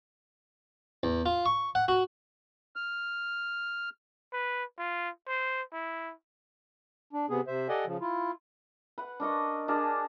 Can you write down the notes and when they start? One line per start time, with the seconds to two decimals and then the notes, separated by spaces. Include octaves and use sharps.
1.03 E2
1.26 F4
1.46 C#6
1.75 F#5
1.88 F#4
2.76 F6
4.33 B4
4.78 F4
5.27 C5
5.73 E4
7.13 D4
7.30 C3 B3 G#4
7.47 C3 C5 E5
7.69 G4 A4 D5 D#5 F#5 G#5
7.86 C#3 F3
8.01 E4 F4
8.98 B4 F#5
9.20 D4 A#4 D#5 C#6
9.68 D4 G#4 A#4 A5